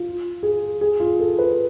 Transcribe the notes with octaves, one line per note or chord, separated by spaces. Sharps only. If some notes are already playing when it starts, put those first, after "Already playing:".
Already playing: F4
G#4
G#4
F4
A4
B4